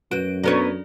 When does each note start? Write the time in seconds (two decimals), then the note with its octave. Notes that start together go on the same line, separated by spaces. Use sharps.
0.11 F#2 F#4 B4 D7
0.44 F#3 B3 D4 A4 C#5 D5